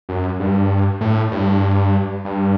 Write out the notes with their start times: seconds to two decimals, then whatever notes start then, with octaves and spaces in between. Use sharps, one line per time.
0.09 F#2
0.40 G2
1.01 A2
1.32 G2
2.25 G2